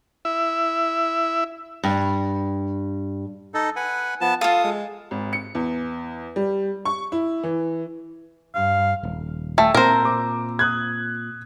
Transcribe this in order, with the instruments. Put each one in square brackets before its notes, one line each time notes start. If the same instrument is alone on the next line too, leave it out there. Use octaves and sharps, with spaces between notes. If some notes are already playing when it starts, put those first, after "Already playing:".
[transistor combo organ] E4 E5
[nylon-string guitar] G2
[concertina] D#4 A4
B4 F#5 G#5
[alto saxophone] F3 [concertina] B3 A5
[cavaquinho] F4 A4 [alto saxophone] F5 [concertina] D#6
[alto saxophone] G#3
[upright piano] G#1
C#7
E2
G3
C#6
E4
E3
[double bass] G2 [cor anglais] F5
[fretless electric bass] D#1
[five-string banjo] A3 [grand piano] G5 A5 E6
[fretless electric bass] A#2 C4 [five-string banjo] A#4 C5
[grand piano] D6
D#6 F#6 G#6